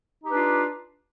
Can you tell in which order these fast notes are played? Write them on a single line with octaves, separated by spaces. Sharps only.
D#4 G4 B4 D4 F4